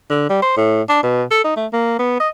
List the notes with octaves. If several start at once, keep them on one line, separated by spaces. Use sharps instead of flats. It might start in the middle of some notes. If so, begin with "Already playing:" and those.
D3
G3
C5
A2
D4
B2
A4
D#4
A3
A#3
B3
D#5